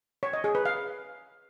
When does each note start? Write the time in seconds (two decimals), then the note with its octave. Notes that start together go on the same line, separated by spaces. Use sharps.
0.23 C#5
0.33 D#5
0.44 G#4
0.55 B4
0.65 F5